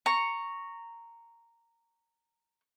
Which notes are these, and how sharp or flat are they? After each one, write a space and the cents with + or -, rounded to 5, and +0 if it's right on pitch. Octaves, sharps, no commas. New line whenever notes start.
A#5 -10 C#6 +0